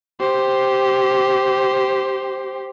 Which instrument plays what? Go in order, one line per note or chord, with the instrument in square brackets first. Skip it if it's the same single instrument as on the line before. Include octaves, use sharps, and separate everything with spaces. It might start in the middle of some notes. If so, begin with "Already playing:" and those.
[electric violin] G4 C5